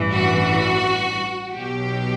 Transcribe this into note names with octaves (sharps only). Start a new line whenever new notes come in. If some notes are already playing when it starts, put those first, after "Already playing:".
Already playing: A1 G2 E3
F#4
B1 B2 F#3 G4